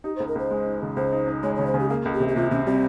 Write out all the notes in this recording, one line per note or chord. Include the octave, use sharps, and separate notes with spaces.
D#4 G4
C5
C#2
A#4
C#2 C5
G#3
D#4
C#3
C#2 C5
D#4
D#4
G#3 C#5
C#3 C#5
C5
C#3
G4
A#3 G#4
C#2
G4
C3
G4
C3 F4
C3 C#4
G3 C4